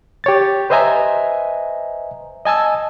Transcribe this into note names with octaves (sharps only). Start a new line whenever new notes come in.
G4 C#5 A6
B4 C5 D#5 E5 G#5 A#5
D#5 G#5 A5 E6